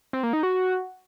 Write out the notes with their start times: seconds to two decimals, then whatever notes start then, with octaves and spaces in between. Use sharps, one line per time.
0.13 C4
0.23 A#3
0.33 D#4
0.43 F#4